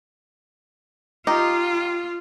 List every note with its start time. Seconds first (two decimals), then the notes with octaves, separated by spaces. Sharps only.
1.27 D#4 F4 G4